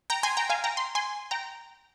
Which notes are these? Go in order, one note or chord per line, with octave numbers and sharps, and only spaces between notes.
G5 A#5
G#5 C6
G5 A#5
F5 G#5
G5 A#5
C6
G#5 C6
G5 A#5